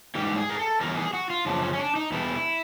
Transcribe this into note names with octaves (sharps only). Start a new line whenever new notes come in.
G#2 E3 G3 G4
G#4
A#4
A4
E2 C#3 E3 G3 A#4
G#4
F#4
F4
F#2 C#3 F3 D4
C#4
C#4
D4
D#4
E2 B2 G3 E4